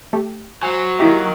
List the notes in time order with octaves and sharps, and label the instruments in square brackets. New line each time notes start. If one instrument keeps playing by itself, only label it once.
[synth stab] A3 G4
[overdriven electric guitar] F#3 [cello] C5 [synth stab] G#5
[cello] D#3 A#3 [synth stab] E4 G4 E5